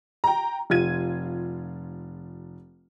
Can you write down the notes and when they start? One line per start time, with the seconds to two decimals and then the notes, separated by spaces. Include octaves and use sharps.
0.24 G5 A#5
0.70 F1 F4 G#6 D#7